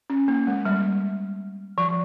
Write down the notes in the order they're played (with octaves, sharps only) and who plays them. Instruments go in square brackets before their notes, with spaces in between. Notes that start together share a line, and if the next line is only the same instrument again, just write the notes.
[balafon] C#4
A#3
G#3
G3
F3